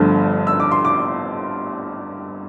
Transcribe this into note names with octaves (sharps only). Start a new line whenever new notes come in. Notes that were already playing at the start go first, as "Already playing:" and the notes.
Already playing: G1 G2 D3 F3 A3
E6
D6
C6
D6